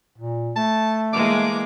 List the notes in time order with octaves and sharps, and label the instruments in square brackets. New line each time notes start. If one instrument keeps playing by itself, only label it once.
[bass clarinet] A#2
[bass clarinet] A3 [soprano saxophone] A5
[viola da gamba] E3 G#3 A#3 [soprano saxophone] D6